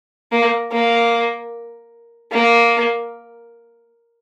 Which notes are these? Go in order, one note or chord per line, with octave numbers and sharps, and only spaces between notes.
A#3
A#3
A#3